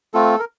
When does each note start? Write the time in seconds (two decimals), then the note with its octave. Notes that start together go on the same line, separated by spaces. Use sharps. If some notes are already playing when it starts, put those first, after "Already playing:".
0.14 A3 C4 F4 A4
0.39 A#4